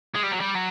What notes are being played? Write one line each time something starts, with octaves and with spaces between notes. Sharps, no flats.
G#3
G3
F#3
G3
F#3